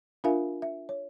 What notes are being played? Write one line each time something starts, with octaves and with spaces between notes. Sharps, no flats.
D4 F4 A#4 E5 F5 G#5
E5
C#5